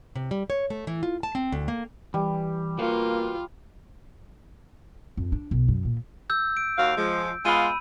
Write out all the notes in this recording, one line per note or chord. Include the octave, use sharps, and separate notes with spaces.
C3
G3
C#5
A3
E3
F4
A5
C4
D2
A#3
E3 G3
A#3 F4 F#4 B4 F5
F2
D4
B1
F#2
A#2
E6 G6
D7
D#2 F#4 F5
F3 G#3
G#3 B3 F4 B5 E6 D#7